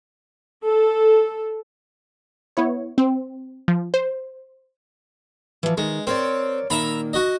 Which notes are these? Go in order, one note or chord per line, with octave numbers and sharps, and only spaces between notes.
A4
B3 E4 C#5
C4
F3
C5
E3 F3
D#3 G#3
C4 A#4 C#5 D5
A#2 D#3 A#3 E5 A#5 B5
F#4 D#5